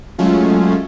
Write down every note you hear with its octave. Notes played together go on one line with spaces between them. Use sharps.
F#3 G#3 A3 C#4 F4